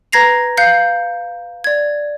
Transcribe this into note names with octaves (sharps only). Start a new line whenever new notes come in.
B4 A#5 G#6 A#6 C7 F7
F5 F#6 G6 C7 C#7
D5 G#6